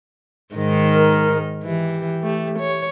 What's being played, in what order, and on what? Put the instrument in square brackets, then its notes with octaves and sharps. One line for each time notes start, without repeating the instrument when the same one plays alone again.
[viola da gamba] G#2 D#3 D#4
[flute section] A#4 F6
[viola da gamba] E3 [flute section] G4
[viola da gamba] A3
C#5